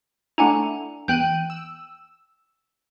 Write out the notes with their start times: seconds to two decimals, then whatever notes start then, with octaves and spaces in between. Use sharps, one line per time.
0.38 A3 D4 E4 F#5 G#5 A#5
1.08 E2 G5 F#6 G6 D#7
1.50 E6